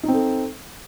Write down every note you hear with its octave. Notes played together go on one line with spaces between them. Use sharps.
C4 D#4 A4